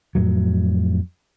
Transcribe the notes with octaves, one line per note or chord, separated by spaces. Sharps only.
F2 A2 F#3